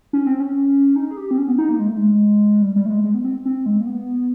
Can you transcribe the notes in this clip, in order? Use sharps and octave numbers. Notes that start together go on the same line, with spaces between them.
C#4
C4
C#4
D#4
G#4
G4
C4
C#4
B3
D#4
A#3
G#3
A3
G#3
G3
G3
A3
G#3
G#3
B3
C4
C4
G#3
A#3
B3